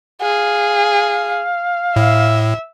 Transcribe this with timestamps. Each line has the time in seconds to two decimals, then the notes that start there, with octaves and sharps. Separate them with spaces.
0.22 G#4 F5
1.96 A2 E5